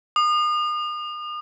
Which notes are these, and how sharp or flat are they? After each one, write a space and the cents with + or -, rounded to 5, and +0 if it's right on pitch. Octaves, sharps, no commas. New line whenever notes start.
D#6 -40